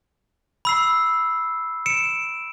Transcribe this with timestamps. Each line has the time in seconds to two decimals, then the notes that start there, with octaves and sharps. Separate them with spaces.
0.65 B5 E6 C7
1.86 C#7 D7 E7